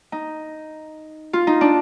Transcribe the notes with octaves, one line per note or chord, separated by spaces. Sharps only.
D#4
F4
D#4
D4